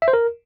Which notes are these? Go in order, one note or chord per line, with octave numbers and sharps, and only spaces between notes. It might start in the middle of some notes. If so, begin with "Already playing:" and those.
E5
C5
A#4